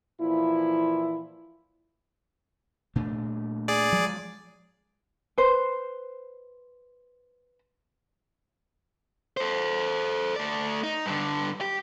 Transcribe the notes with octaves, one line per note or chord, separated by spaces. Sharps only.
A#2 E3 F3 E4
A#2 A3 D4
G#4 D5
F3 F#3 G#3
B4 C5
A4 C5
A3 D5
D#4
G2 D3
G4